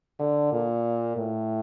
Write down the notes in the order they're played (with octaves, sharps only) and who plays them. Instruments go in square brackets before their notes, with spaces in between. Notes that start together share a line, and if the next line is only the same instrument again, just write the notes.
[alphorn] D3
A#2
A2